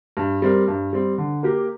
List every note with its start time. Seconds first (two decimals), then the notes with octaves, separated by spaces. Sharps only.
0.17 G2
0.42 G3 C4 A#4
0.68 G2
0.93 G3 C4
1.18 D3
1.43 A#3 G4 A#4